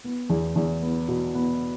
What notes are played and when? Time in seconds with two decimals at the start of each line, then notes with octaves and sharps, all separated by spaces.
0.04 B3
0.29 E2
0.56 E2
0.82 B3
1.08 B2
1.35 B3